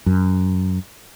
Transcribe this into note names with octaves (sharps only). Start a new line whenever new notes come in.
F#2